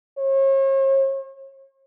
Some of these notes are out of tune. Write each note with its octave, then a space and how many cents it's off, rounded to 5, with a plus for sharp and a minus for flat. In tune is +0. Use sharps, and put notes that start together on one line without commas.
C#5 -40